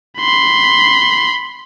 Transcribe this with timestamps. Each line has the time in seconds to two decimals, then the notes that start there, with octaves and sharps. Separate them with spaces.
0.19 B5 C6